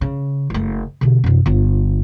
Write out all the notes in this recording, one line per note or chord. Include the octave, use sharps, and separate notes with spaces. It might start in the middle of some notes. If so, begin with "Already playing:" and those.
C#3
F#1 A3
B2 D3
F#2 C3
G1 F4